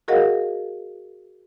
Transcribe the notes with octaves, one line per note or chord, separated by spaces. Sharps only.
F#4 G#4 A#4 D#5 F5 F#5